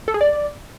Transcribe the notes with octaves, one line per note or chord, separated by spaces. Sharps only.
A4
G#4
D5